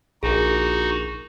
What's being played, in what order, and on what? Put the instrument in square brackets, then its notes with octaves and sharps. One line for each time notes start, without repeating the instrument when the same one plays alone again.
[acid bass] A#1 [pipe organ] D#4 F#4 [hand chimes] G#4 A#4